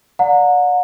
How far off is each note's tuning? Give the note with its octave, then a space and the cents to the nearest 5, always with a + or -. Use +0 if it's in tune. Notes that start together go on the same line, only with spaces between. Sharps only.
D5 -10 F#5 -40 A#5 -20